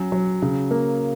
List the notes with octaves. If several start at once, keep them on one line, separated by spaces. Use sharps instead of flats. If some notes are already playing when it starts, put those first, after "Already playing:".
Already playing: F#3 C#4
F#3
C#3
A#3